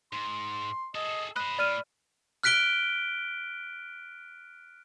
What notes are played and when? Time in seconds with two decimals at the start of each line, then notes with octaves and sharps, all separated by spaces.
0.13 G#2 C6
0.95 G#4 A4 D#5
1.36 C5 D#5 B5 F#6
1.59 A2 D5 F6 D#7
2.43 F6 F#6 B6 D7 G7